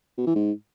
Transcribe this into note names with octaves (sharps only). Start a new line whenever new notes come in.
B2
E3
G#2